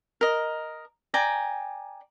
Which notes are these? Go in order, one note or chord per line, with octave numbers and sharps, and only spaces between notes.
A#4 D#5
D5 G5 G#5 A#5